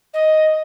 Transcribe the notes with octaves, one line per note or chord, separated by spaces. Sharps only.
D#5